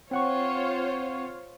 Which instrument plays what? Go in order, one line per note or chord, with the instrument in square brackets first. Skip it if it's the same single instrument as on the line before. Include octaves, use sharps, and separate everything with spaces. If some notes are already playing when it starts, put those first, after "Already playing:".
[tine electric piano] C4 F#5 C#6 [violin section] F4 C5 C#5